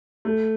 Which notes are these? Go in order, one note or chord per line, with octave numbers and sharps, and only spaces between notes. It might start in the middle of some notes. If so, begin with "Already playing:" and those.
A3